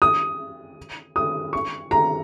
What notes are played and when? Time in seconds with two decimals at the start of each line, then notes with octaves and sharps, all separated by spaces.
0.02 D#6
1.16 D#6
1.53 C#6
1.91 A#5